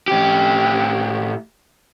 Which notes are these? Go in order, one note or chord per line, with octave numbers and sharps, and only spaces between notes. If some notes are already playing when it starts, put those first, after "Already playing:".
A2 G4